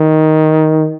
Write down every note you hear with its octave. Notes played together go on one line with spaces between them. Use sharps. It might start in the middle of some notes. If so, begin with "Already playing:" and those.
Already playing: D#3